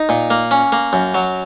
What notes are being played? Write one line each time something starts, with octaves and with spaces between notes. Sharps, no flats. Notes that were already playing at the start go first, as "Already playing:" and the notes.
Already playing: D#4
A#2
A#3
C#4
A#3
F#2
F#3